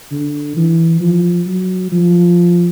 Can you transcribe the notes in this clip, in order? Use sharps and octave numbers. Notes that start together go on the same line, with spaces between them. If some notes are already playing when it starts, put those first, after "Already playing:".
D3
E3
F3
F#3
F3